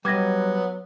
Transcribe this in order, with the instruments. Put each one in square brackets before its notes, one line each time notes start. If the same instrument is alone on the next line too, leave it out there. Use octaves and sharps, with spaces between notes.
[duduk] F#3 [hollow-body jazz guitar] G3 D#5 [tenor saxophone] B3 [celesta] D6 G#6 A#6